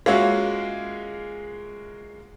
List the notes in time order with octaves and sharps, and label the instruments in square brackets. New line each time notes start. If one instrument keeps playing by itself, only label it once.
[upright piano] G#3 A#3 C#4 F4 F#4 E5